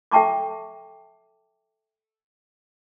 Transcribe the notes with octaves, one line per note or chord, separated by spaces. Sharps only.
A4 E5 G5 A5 C#6 D6